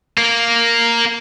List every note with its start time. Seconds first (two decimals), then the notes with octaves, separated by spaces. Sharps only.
0.18 A#3